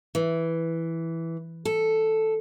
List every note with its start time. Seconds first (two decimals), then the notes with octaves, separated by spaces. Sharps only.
0.15 E3
1.65 A4